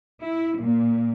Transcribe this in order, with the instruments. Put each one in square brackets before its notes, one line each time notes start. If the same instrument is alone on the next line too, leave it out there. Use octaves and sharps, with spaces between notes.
[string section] E4
A#2